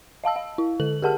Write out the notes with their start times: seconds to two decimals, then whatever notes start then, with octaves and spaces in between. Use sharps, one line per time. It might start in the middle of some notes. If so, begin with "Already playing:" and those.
0.24 D#5 F5 A5 E6
0.36 F5
0.58 E4
0.80 D3 A4 F#7
1.02 G4 G#4 A#4 F#5 A5 F6